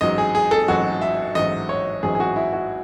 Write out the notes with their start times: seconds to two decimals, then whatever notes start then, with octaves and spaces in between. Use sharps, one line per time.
0.01 A1 G#2 F#3 D#5
0.18 G#4
0.35 G#4
0.51 A4
0.68 A1 G#2 F#3 F#4
1.01 E5
1.35 A1 G#2 F#3 D#5
1.69 C#5
2.03 A1 G#2 F#3 G#4
2.15 G#4
2.20 F#4
2.36 E4
2.53 F#4